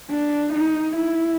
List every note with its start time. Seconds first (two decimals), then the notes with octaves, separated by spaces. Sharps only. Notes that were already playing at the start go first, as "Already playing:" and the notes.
0.10 D4
0.53 D#4
0.96 E4